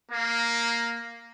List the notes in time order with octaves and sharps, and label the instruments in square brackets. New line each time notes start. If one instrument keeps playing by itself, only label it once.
[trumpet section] A#3